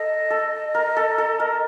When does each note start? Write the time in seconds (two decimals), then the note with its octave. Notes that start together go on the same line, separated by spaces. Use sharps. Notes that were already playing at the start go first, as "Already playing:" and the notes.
Already playing: A4 D#5
0.30 A4
0.75 A#4
0.97 A4
1.18 A4
1.40 A#4